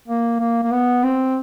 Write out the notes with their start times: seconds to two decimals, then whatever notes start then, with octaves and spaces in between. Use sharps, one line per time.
0.08 A#3
0.40 A#3
0.63 A#3
0.72 B3
1.04 C4